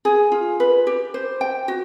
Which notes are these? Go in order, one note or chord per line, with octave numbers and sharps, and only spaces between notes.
G#4
F4
B4
G4
C5
G5
F#4